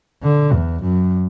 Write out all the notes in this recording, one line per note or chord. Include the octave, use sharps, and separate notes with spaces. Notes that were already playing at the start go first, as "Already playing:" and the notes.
D3
E2
F#2